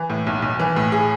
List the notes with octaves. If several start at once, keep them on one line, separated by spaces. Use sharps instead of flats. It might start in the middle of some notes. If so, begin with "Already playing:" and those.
Already playing: E3
A2
B1
B1
E3
A2
G#4